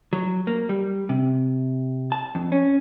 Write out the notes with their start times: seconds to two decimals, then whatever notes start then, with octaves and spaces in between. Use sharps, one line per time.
0.13 F#3
0.47 A#3
0.69 G3
1.09 C3
2.12 A5
2.35 F2
2.52 C#4